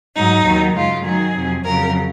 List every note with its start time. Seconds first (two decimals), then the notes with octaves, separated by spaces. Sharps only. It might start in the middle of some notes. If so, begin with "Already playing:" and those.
0.15 G#2 F#3 D#4
0.45 D#2 D#3 F#3
0.75 F#2 C#3 G#3 F4
1.04 F#2 D#3 F#3 G#4
1.35 F2 C3 F#3
1.64 F2 C#3 F#3 A#4